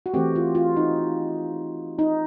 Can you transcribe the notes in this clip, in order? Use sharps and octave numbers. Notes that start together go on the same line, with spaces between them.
F#4
E3 A3 C4 G4
F4
F4
D#4
D#4